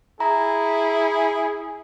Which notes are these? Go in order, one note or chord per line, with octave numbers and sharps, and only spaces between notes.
E4 G#4 A#5